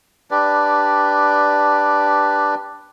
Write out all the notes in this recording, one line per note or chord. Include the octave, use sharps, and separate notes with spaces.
D4 G4 B4 D5